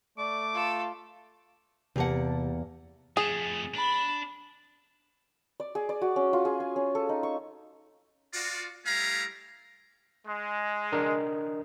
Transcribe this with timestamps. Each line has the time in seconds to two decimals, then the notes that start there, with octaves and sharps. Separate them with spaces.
0.18 A3 D5 D6
0.55 F4 A4
1.96 E2 C3 A#3 G4 F#5 A5
3.17 F2 A3 G#4
3.75 D4 B5
5.60 D5
5.75 G#4
5.89 D5
6.02 F#4
6.16 C#4
6.33 F4
6.45 G#4
6.60 G#5
6.76 C#4
6.95 A4
7.09 D#4
7.23 C#6
8.34 F4 F#4 D5
8.86 G3 A3 E4 F5 G#5 A#5
10.26 G#3
10.92 D4 A#4 D#5